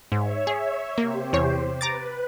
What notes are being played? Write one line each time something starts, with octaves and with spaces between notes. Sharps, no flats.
G#2 C#5 E5
G#4
C3 A#3 G4 C5
E2 C#5
B4 A#5 D6 A6